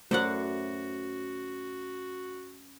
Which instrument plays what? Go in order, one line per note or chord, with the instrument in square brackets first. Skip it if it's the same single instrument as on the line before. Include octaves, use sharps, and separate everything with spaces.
[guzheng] F#2 [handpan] A3 [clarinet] F#4 [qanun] C5 D5 F#5